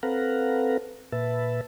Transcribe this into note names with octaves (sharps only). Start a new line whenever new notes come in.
C4 A4 B4 F5 F#5 A#5
A#2 B4 E5 A5